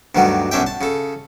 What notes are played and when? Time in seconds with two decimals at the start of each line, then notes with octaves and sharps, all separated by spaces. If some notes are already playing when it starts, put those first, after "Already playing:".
0.15 D2 G2 D#3 F#3 G3
0.51 B1 F#2 C#4 D4 E5 G5
0.67 A5
0.81 C#3 A4